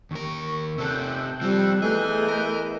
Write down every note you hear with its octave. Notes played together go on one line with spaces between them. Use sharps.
D#2 A#4 C#6
C3 A4 E6 F#6 G6
F3 G3 C4
E2 E3 A3 G#4 D#5
A#4